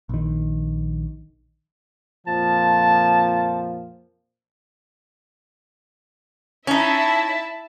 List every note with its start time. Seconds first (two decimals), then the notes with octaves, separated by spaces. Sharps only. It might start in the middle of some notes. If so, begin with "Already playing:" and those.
0.09 A#1 D#3
2.27 F2 A#2 F3 A5
6.67 C#4 D#4 E4 E5 A5